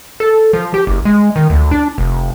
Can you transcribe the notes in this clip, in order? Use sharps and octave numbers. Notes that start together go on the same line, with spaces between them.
A4
F3
G4
F#1
G#3
D#3
D2
D4
F1